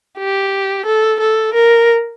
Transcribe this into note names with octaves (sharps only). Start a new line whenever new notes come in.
G4
A4
A4
A#4